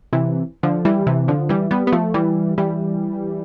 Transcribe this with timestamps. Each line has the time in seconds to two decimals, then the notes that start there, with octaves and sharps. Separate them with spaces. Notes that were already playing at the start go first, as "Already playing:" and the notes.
0.13 C3 E3
0.63 D3 F3
0.85 E3 G3
1.06 C3 E3
1.28 D3 F3
1.49 E3 G3
1.71 G3 B3
1.87 B3
1.92 F3 A3
2.14 E3 G3
2.58 E3 G3